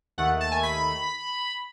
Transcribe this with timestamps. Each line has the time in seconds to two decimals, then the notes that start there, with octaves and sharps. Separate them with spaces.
0.18 D#2 D#3 A3 F#5
0.41 A5
0.52 G#5
0.63 B5